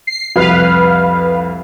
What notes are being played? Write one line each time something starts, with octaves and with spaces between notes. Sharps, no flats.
C7
C2 F2 B4 F5